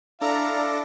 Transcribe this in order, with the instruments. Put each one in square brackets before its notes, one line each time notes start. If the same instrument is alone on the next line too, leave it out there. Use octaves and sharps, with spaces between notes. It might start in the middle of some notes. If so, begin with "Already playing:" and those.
[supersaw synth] D4 A4 A#6 [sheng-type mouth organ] E4 D5 D6 [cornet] F5 [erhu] A#5